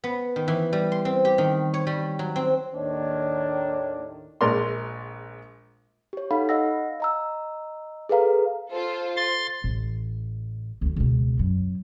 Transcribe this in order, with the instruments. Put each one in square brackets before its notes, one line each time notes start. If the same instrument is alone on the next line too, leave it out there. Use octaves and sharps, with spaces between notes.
[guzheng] B3
D#3
E3
G3
C6
C4
G4
D#3
C#5
G3
F#3
C4
[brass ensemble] D#2 A2 D#3 [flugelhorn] D4 [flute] C#5
[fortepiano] A#1 G#3 A#4 D5 C6
[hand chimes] G4 C#5
D#4 A4 F5 F#5 B5
D#5 F5 F#5 E6 A#6
D#5 A#5 E6
G#4 A4 B4 F5 A#5
[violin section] F4 A4 [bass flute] C5
[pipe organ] C6 A6
[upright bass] A1
D2 D#3
C#2 B2
F#2